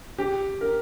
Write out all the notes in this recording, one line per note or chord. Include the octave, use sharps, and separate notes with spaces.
G4
A#4